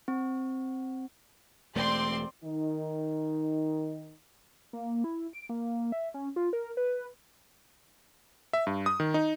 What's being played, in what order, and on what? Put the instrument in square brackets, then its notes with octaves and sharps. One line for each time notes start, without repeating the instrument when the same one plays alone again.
[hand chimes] C4
[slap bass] E1 A3 [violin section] C4 D5 C6
[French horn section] D#3 D#4
[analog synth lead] A#3
E4
D7
A#3
E5
C#4
F4
A#4
B4
[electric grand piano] E5
G2
D#6
D#3
D#4